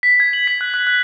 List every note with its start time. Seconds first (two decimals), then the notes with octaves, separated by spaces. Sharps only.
0.03 B6
0.20 G#6
0.33 F#7
0.47 B6
0.61 F#6
0.74 F#6
0.87 F#6